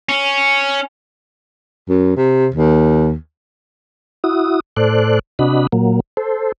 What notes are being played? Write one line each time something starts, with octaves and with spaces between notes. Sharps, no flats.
C#4
F#2
C3
D#2
E4 F#4 D#6
A2 A4 C5 D5 F#6
C3 D4 F#4 D#5 B5
A#2 F#3 A#3
A4 C5